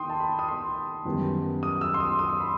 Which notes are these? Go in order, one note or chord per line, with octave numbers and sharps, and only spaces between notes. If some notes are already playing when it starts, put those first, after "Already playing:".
Already playing: D#3 G5 C6 D#6
A5
B5
D#6
C6
F#2 D#3 G3 B3
D#6
E6
C6
D#6
D#6
C6
B5